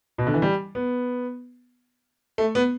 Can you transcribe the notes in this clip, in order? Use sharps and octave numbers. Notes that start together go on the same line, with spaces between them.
B2
D3
E3
G3
B3
A3
B3